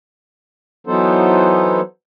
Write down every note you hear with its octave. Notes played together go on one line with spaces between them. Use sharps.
E3 F#3 B3 D#4 A4 C5